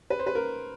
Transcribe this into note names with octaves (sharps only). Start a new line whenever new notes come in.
B4
C5
B4
A#4